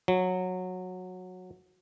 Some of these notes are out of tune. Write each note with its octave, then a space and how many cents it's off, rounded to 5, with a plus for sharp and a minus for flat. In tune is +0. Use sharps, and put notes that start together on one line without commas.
F#3 -15